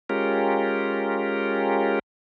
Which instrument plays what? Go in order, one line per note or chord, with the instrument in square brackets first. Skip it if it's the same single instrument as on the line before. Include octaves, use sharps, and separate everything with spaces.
[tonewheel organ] G#3 C#4 F4 G4 A#4